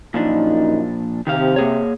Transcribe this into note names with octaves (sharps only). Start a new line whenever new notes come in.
F#2 A#2 F3 D4 D#4
C3 D#3 G4 F5
A#3 G#4 C#5